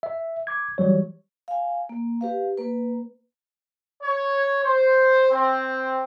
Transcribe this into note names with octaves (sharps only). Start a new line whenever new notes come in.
E5
D6 G#6
E3 F#3 G3 C#5
F5 G#5
A#3
G4 B4 F5
A#3 B4
C#5
C5
C4